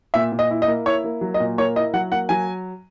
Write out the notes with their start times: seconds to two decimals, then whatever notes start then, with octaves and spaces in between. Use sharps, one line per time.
0.14 A#2 E5
0.32 A#2
0.39 D#5
0.51 E4
0.62 D#5
0.68 A#3
0.86 E4 C#5
1.04 A#3
1.21 F#3
1.34 D#5
1.40 A#2
1.58 A#3 C#5
1.76 E4 D#5
1.93 F#3 F#5
2.12 A#3 F#5
2.29 F#3 G#5